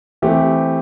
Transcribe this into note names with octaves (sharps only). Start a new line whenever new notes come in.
E3 A3 C4 G4